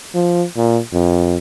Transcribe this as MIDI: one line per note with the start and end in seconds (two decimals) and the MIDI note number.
0.14 0.44 53
0.56 0.79 46
0.93 1.38 41